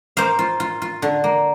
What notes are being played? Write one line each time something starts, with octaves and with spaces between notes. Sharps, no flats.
A#3 C5 F5
F4
F4
F4
D3
A#3